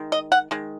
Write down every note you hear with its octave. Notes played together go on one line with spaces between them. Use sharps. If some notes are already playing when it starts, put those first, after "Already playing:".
Already playing: D#3 G#3
D#5
F#5
D#3 G#3